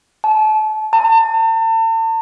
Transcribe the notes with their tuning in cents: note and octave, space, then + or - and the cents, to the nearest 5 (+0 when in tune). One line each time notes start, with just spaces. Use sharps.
A5 -30
A5 +40